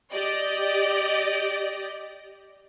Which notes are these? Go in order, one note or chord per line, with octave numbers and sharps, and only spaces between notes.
G4 D5 D#5